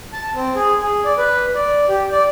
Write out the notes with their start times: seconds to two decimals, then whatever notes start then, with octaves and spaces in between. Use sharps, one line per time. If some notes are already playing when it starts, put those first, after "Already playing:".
0.13 A5
0.35 C4
0.55 G#4
0.80 G#4
1.04 D5
1.17 B4
1.55 D5
1.88 G4
2.12 D5